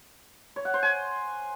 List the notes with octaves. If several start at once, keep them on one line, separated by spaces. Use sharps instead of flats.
C#5
F#5
C5
G#5